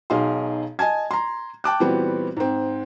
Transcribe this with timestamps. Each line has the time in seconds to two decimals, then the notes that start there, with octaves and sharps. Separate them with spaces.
0.10 B1 D#4 G#4 F5 C6
0.79 D#5 G#5 A5 G#6
1.11 A#5 C6
1.64 G5 A5 D6 F#6
1.80 A#2 E3 G3 B3 C4 F#4
2.37 G#2 C4